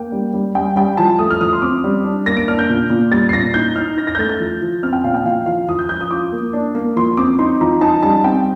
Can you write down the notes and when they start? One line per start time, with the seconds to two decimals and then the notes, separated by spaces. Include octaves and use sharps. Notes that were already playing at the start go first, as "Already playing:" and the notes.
Already playing: A#3 G5
0.12 G3
0.34 G3
0.55 G3 G5
0.76 G3 G5
0.97 F3 A5
1.19 A3 D#6
1.30 F6
1.41 F3 D#6
1.53 C6
1.62 C4 D6
1.84 G3
2.04 D4
2.26 A#3 A#6
2.37 D7
2.48 D4 F6
2.59 G6
2.69 A#2
2.90 A#2
3.11 G3 A6
3.29 C7
3.33 A#2 A#6
3.54 D#4 G6
3.75 D#4 F6
3.97 D#4 A#6
4.07 A#6
4.15 G6
4.18 A3 A6
4.29 G6
4.40 F3
4.62 F3
4.83 C4 F6
4.93 G5
5.04 A#2 F5
5.14 G5
5.25 F3 F5
5.46 F3 F5
5.68 F3 D#6
5.79 G6
5.89 F3 G6
6.01 D#6
6.11 F4 D6
6.32 A#3
6.53 D4
6.75 A#3
6.96 F3 C6
7.17 C4 D6
7.39 D#4 C6
7.61 F3 A#5
7.81 D#4 A5
8.03 G3 A5
8.24 C4 G5